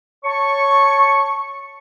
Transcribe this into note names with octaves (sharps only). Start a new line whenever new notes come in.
C#5 A5 C#6